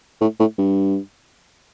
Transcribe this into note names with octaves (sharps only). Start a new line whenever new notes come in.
A2
A2
G2